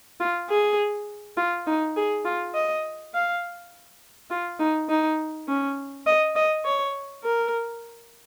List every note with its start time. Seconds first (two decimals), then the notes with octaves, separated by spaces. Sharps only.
0.20 F4
0.50 G#4
1.37 F4
1.66 D#4
1.96 G#4
2.25 F4
2.54 D#5
3.14 F5
4.30 F4
4.59 D#4
4.89 D#4
5.48 C#4
6.06 D#5
6.36 D#5
6.65 C#5
7.24 A#4